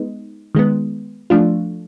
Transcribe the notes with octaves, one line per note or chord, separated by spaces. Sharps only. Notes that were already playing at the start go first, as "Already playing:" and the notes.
Already playing: G#3 B3 D#4
D#3 G#3 B3
F3 A3 D4 F4